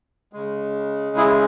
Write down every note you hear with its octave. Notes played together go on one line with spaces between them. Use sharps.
C#3 G#3
E4 G#4